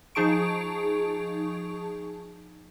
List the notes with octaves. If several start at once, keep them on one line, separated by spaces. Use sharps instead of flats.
F3 D#4 G#4 A5 C#6 D7